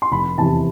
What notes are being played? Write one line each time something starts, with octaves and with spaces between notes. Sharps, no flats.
C6
F1 B5
E2 C3 A5